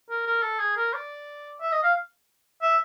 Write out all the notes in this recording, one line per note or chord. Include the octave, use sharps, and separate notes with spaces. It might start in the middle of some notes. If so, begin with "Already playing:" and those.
A#4
A#4
A4
G#4
A#4
D5
E5
D#5
F5
E5